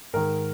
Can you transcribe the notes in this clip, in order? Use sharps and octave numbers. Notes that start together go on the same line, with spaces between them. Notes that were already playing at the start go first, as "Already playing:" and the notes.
G#2 D#3 A#4